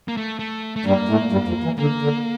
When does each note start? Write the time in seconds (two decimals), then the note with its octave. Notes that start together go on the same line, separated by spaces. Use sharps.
0.08 A#3
0.17 A3
0.39 A3
0.76 A3
0.85 G2 G3 A#3
1.09 A2 A3
1.32 G2 G3
1.48 F2 F3
1.64 E3
1.79 D3 A#3
2.02 D3